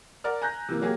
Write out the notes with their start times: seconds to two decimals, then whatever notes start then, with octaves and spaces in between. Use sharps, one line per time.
0.24 A#4 D5 F#5 F6
0.42 G#5 A#5 F#6 G6 A#6
0.68 C3 E3 A#3
0.82 F#3 A#3 G4 G#4